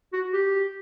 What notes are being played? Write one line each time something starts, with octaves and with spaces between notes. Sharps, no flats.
F#4
G4